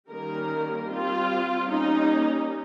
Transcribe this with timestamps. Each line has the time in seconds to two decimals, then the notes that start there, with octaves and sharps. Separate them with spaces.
0.09 D#3 G3 A#3 C#4 A#4
0.89 G3 C4 F4
1.68 G3 A#3 C#4 D#4